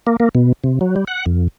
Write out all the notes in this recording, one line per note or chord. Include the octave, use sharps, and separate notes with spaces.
A#3
A#3
B2
C3
F#3
G3
F#5
F2